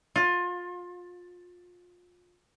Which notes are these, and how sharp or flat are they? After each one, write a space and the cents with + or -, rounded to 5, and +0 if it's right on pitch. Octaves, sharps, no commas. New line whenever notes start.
F4 +25